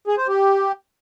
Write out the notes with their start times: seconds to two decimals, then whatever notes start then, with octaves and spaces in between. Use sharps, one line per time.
0.07 G#4
0.18 C5
0.28 G4